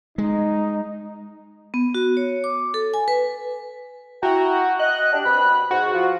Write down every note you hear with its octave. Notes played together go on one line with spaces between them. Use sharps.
G#3 D#4
B3
F#4
C#5
D6
A4
G#5
B4
E4 F#4 G5 A#5
D#5 F#6
D4 G4
B2 C4 B5
G#2 F#4
F3 F4